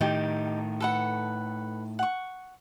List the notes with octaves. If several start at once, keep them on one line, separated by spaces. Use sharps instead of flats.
A2 D#3 D#4 G4
A4 B4 F#5
F#5 C#6